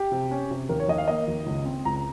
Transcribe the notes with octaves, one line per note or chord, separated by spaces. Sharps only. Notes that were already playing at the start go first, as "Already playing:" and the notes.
Already playing: G4
C3
C#4
C3
D#2 A#4
C#5
D#2 D#5
F5
A#3 D#5
D#2
C#2
C4
C#2 A#5